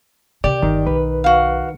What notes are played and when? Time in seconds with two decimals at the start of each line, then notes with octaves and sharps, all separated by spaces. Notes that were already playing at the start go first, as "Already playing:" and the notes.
0.44 C3 D#3 G4 D5
0.62 G1 D#3
0.87 B1 B4
1.24 F#4 F5